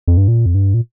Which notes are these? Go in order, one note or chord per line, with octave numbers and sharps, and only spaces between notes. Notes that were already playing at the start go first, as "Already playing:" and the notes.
F2
G2
A#2
F2
G2
A#2